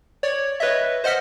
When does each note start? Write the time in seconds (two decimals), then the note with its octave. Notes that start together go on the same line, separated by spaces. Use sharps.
0.23 C#5 D5
0.60 B4 C#5 D#5 E5
1.04 C5 D#5 F#5 F6 B6